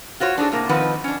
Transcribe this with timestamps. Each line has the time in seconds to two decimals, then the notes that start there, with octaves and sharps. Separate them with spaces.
0.20 F4 F#4 C5 C#5
0.38 D4 D#4 G#4 A4
0.52 A2 C3 A#3
0.69 D#3 F3 C4 D#4 B4 F#5
1.04 C#4 D4